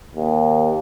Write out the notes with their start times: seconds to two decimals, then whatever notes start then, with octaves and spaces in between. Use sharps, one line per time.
0.16 D#2